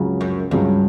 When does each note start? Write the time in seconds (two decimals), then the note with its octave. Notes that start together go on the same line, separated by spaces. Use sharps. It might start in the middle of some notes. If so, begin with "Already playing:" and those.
Already playing: C#2 C#3 F#3
0.21 F#2
0.51 C#2 G2 C#3 F#3